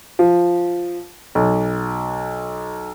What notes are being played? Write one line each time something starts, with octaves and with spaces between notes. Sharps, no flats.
F3
B1